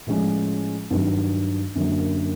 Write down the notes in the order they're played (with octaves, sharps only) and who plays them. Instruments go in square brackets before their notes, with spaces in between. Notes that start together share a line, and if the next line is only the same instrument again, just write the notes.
[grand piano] A2 F3 G#3 C#4
G2 D#3 F#3
F#2 D3 F#3 A#3